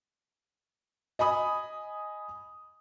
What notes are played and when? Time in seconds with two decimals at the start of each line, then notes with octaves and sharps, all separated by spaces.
1.19 D#5 G#5 B5 D#6